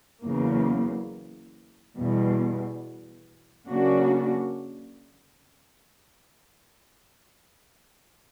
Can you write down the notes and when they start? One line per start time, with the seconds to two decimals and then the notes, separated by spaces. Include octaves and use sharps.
0.23 E2 C#3 F#3 A#3
1.95 E2 B2 G3
3.67 C#3 F#3 A#3 D4 F#4